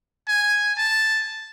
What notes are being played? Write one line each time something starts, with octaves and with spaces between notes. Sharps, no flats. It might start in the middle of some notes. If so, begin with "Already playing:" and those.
G#5
A5